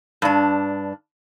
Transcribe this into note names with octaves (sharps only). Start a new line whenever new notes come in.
G2 D4